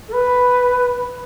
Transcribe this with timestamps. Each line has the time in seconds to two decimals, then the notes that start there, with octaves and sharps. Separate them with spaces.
0.08 A4
0.13 B4